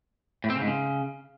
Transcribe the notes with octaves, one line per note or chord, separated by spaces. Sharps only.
A2
C4
C#3
G#2
C#3